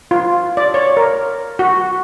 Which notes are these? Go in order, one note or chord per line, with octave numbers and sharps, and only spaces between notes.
F4
D5
C#5
A#4
F#4